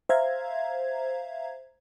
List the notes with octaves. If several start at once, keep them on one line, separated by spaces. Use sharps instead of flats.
C5 E5 F5 A#5 G#6